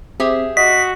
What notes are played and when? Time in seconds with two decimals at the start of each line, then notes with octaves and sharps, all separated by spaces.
0.20 C4 G4 G#4 E5
0.57 F#4 D#5 B6